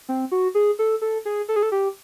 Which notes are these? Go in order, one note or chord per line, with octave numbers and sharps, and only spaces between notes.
C4
F#4
G#4
A4
A4
G#4
A4
G#4
A4
G4